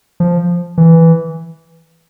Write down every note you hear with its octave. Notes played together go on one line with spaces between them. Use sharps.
F3
E3